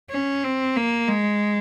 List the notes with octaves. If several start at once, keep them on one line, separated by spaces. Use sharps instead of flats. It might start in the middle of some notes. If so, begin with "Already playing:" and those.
C#4
C4
A#3
G#3